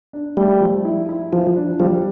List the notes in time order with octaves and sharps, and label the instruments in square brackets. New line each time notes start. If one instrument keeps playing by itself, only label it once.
[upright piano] D4
[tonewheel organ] G3 [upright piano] A3
[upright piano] F3
E4
E4
[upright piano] E3 [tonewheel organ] F3
[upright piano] D4
[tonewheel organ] F3 [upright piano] G3